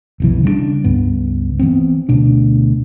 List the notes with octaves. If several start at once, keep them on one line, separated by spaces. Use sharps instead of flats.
F1 B1 E3
C#3 G3 A3 D4
C#2 G2 B3
E3 B3 C4
D2 B2 D4